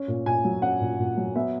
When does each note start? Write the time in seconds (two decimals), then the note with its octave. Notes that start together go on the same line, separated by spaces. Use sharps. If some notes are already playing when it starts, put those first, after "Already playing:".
Already playing: C#4
0.08 A#2
0.26 A#2 G#5
0.45 F#3
0.62 C#4 F#5
0.81 A#2
0.99 A#2
1.17 F#3
1.36 B3 E5